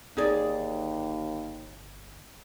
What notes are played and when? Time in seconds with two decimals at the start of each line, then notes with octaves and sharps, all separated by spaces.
0.17 G1 D#2 D#4 G#4 D5